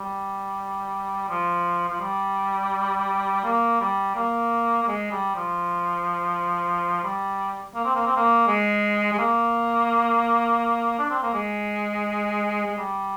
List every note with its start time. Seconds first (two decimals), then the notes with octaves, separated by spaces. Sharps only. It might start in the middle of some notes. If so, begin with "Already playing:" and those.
Already playing: G3
1.29 F3
1.89 F3
2.01 G3
3.44 A#3
3.81 G3
4.15 A#3
4.83 A#3
4.88 G#3
5.12 G3
5.36 F3
7.04 G3
7.75 A#3
7.85 C4
7.95 A#3
8.07 C4
8.16 A#3
8.47 G#3
9.13 G#3
9.18 A#3
10.99 D4
11.10 C4
11.22 A#3
11.34 G#3
12.66 G#3
12.78 G3